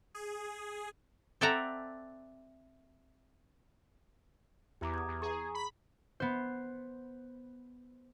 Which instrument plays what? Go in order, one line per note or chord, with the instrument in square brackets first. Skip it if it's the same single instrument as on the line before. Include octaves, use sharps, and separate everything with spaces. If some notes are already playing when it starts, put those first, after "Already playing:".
[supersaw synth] G#4
[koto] C4 A4 D5 E5 F#5 A#5
[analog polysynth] E2 [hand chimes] G4 A#5 D6
[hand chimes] D#6 G#6
[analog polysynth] E2
[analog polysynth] G#4 [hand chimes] A#5 C#6
[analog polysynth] B5
[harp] B3 C5